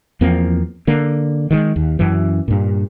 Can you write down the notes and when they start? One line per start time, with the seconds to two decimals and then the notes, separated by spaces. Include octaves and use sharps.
0.21 E2 F3 A#3 C4
0.87 D3 A#3
1.51 D#3 F#3 G#3
1.76 D#2
1.99 F#2 E3
2.48 G2 A#2